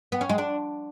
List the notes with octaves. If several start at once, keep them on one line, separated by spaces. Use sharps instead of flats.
B3
C#4
G#3
D4